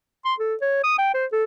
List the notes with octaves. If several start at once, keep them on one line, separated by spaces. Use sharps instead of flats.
C6
A4
C#5
D#6
G5
C5
A4